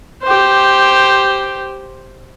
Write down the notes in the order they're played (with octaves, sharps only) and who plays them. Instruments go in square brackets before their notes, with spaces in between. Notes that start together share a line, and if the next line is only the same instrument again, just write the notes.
[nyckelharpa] G4 C5